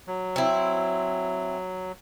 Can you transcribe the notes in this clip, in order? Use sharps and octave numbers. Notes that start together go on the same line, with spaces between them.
F#3
C4 E4